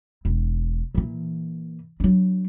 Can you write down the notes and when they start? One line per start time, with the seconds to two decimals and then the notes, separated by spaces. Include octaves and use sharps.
0.25 E1
0.95 A#2 E3
2.00 F#3 D4